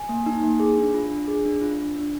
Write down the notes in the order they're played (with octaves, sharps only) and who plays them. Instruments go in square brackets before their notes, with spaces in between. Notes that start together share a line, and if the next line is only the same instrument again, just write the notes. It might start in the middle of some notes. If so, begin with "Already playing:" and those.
Already playing: [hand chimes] G#5
A#3
D#4
A#3
G#4
D4
F4
D4
G#4
D4
F4
D4
D4